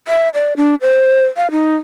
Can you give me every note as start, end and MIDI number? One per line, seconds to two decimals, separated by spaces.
0.08 0.29 76
0.34 0.53 74
0.57 0.75 62
0.82 1.25 72
1.37 1.51 77
1.51 1.76 63